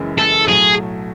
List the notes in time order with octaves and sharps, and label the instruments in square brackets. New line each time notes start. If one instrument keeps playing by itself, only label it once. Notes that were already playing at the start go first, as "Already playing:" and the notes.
Already playing: [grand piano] F#1 F#2 C#3 E3 G#3
[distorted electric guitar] A4
[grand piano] B1 A2 F#3 A3 [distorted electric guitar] G#4